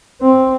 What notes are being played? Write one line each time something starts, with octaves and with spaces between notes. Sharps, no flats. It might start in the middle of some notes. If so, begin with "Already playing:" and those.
C4